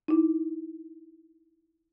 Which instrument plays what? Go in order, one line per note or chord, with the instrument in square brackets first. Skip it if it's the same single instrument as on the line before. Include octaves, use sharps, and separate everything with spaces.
[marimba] D#4 E4